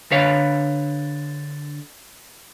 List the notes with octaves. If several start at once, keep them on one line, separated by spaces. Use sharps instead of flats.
D3 B4 C#5 F5